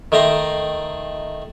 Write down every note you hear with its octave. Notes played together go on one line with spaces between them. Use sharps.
D#3 A3 G5 A#5 C6